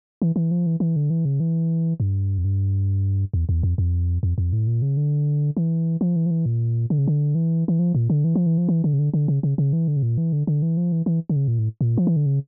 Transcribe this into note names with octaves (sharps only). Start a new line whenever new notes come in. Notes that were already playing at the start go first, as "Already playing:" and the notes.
E3
E3
F3
E3
E3
D3
E3
C#3
E3
G2
F2
G2
E2
E2
F2
F2
F2
F2
A2
A#2
C#3
D3
E3
F3
E3
F3
E3
A#2
D3
C#3
D3
E3
E3
F3
A#2
D3
E3
F3
E3
F3
E3
D3
C#3
D3
D3
C#3
C#3
C#3
E3
D3
C#3
A#2
E3
D3
D3
E3
F3
E3
E3
D3
C#3
A#2
A2
A#2
F3
E3
D3
C#3